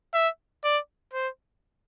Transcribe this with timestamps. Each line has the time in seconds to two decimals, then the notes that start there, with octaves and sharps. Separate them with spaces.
0.13 E5
0.64 D5
1.13 C5